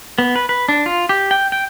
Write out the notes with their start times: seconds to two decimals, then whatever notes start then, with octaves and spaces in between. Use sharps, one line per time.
0.18 B3
0.36 B4
0.49 B4
0.69 D4
0.86 F4
1.09 G4
1.31 G5
1.52 G5